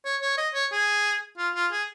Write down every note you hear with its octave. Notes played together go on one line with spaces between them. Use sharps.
C#5
C#5
D#5
C#5
G#4
F4
F4
G#4